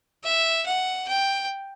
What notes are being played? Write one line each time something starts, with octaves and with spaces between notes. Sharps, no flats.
E5
F#5
G5